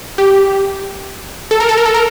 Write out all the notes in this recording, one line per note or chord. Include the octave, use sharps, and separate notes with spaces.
G4
A4
A#4
A4
A#4
A4
A#4